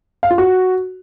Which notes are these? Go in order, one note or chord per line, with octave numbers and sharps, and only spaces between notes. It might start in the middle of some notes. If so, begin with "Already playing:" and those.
F5
F4
F#4